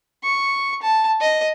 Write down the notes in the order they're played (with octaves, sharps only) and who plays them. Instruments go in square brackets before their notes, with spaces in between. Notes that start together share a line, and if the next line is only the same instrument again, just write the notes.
[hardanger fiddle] C#6
A5
D#5